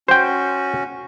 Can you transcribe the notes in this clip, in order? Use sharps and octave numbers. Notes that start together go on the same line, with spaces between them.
C#4 F#4 C5 G5